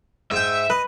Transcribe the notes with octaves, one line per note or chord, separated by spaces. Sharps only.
G#2 E5 G5
B4 D#5